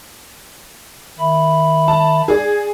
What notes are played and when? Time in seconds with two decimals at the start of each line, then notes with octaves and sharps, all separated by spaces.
1.19 D#3 E5 B5
1.88 A5
2.28 G#4 D5 G#6